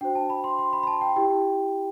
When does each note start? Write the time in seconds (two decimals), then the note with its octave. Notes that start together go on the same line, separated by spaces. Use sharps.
0.01 D4 F#4 C5 G5
0.15 A5
0.30 B5
0.44 C6
0.59 C6
0.73 B5
0.83 B5
0.87 A5
1.01 G5
1.16 E4 G4 G5